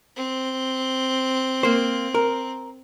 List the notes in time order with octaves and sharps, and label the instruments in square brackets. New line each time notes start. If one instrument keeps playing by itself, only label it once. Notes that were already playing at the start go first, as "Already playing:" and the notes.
[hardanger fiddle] C4
[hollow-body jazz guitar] A#3 C5
A#4